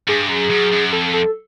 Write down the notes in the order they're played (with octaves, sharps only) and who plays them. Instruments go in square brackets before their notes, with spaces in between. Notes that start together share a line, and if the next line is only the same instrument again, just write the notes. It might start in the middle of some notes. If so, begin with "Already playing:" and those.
[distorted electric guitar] G2 [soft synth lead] G#4
[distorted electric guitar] F#2
F#2
F#2
[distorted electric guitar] F2 [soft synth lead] A4
[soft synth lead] A4